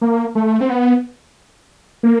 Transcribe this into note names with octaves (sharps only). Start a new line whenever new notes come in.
A#3
A3
C4
B3
A#3